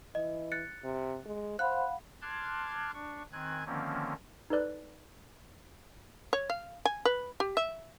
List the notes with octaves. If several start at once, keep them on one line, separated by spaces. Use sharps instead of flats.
E3 D#5
F#6 A6 C#7
C3
G#3
C5 F5 F#5 B5 F#6
A5 C6 D6 F6 F#6 G#6
D4 C#6
D#3 C4 G#5 F#6 G#6
D3 D#3 F3 A#3 C4 C#4
D#4 A4 B4 D5 F#6
C#5
F5
G#5
B4
G4
E5